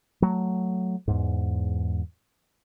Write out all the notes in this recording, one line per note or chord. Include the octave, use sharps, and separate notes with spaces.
F#3 A3
E2 G#2